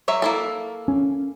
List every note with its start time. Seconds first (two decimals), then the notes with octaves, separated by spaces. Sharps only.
0.08 F#3 C#5 E5
0.22 A#3 E4 A4
0.88 C#4